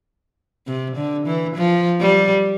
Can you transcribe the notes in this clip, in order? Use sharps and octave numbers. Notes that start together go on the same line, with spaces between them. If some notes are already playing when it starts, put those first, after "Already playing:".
C3
D3
E3
F3
G3